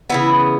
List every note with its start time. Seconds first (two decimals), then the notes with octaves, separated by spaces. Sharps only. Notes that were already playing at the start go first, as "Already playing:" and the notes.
0.09 C#3 E3 B3 E4